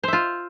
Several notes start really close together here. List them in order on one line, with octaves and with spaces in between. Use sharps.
C5 E5 F4